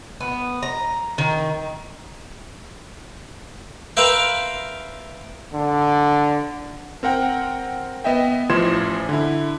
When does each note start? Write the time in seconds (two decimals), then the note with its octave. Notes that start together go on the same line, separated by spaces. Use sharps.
0.20 B3
0.63 A#5
1.18 D#3
3.97 A#4 B4 E5 F5 G5 C6
5.53 D3
7.03 C4 A#4 F#5 G5
8.04 B3 D#5 E5 G5
8.50 A1 E3 F3 C6 G#6 E7
9.09 D3 E4